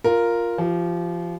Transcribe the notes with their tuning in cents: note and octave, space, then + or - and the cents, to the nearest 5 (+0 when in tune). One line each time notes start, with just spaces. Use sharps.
F4 +0 A#4 +0
F3 -25 G4 -35